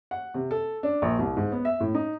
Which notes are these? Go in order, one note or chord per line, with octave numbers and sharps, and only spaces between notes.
F#5
C3
A4
D4
A#1
C2
G#2
B3
E5
A2
D#4